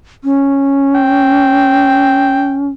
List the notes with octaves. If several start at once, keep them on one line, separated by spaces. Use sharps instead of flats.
C#4
G5